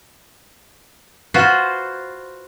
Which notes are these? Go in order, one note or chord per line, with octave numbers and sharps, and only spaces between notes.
F4 F#4 B4 C5